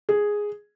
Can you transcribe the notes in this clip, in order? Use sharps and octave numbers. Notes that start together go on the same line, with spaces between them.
G#4